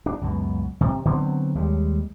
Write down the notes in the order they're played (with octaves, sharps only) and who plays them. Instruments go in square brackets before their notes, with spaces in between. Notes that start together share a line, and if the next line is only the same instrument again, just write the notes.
[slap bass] D4
C#2 F#2 B2
C3
D3 F#3 B3 C4
D#2 G3 G#3